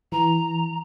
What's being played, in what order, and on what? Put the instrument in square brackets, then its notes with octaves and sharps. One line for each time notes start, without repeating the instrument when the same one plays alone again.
[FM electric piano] E3 [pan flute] A#5